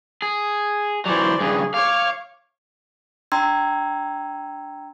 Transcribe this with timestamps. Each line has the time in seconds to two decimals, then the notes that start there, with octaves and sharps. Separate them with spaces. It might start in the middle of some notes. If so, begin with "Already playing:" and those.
0.22 G#4
1.06 E3 F#3 C5 D5
1.41 G2 C#3 G#4
1.74 C#5 F5 D6
3.32 D4 G5 A#5 C6 E6 G#6